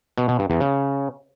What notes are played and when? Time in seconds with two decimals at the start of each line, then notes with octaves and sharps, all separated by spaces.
0.18 B2
0.28 B2
0.39 G2
0.50 E2
0.60 C#3